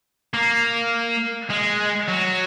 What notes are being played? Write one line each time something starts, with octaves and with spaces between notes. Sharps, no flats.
A#3
G#3
F#3